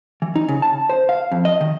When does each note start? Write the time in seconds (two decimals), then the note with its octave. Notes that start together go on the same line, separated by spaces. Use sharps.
0.22 E3
0.36 D#4
0.48 C#3
0.62 A5
0.89 C5
1.09 F5
1.31 F2
1.45 D#5
1.61 D#3